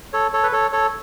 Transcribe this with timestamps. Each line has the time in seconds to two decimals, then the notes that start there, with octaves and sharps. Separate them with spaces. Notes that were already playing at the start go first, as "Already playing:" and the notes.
0.13 A4 C#5
0.33 A4 C#5
0.43 B4
0.52 A4 C#5
0.72 A4 C#5